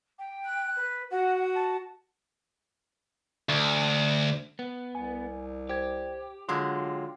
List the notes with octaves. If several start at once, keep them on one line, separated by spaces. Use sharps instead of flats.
G5
F#6
B4
F#4 F#5
A5
D2
B3
C2 G#5
G4 C5 G#6
D3 F#3 G#3 F4 C6